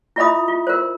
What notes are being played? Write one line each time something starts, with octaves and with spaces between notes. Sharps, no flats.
E4 F4 D#5 E5 B5 D#6
F4
A#4 C5